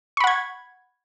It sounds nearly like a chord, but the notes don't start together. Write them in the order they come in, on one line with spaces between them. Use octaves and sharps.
C#6 B5 F#5 G#6